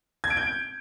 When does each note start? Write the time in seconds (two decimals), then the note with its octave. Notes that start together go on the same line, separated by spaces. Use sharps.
0.24 G#6
0.30 D7
0.37 G6